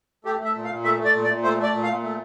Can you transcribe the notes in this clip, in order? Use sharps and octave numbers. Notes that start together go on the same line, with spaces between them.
A3 G4
A3
E5
A#2
F5
A#2
A3 E5
A3
D5
A#2
D5
A#2
A3 C5
A3
D5
A#2
F5
A#2
A3